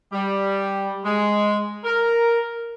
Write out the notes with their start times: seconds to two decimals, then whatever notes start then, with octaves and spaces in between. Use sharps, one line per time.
0.13 G3
1.05 G#3
1.84 A#4